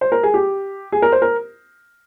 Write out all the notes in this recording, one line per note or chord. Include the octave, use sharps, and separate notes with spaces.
C5
A#4
G#4
G4
G#4
A#4
C5
A#4